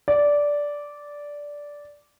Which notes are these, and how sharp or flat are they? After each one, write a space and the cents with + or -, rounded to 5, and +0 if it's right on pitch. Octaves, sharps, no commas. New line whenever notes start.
D5 -10